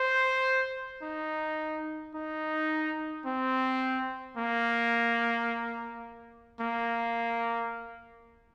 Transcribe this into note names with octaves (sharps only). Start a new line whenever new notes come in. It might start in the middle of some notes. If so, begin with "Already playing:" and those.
Already playing: C5
D#4
D#4
C4
A#3
A#3